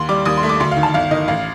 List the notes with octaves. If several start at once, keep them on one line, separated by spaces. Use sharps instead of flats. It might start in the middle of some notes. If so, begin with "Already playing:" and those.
Already playing: D#2 C6
G3 D6
D#2 D#6
C6
A3
D6
D2 C6
F5
D#3
A5
G1 F5
D#3 D#5
A1 F5